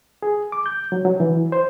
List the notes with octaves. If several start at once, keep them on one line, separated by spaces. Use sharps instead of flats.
G#4
D6
G6
F#3
F#3
E3
C5